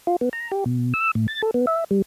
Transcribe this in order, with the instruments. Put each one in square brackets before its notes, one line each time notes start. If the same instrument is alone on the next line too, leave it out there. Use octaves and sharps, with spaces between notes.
[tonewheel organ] F4
B3
A#5
G4
B2
E6
A2
A6
A4
B3
E5
G3